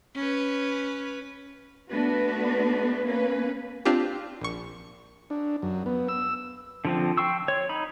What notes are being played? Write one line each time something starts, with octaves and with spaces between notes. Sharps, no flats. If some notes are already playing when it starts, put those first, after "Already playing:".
C#4 B4
A3 B3 D4 F#4 B4
A#3 B3 C#4 B4
C4 D4 F4 G4
A#1 C#6
D4
F#2
B3
E6
D3 F3 C4
G5 C6 C#6 E6
C#5
D#4 B5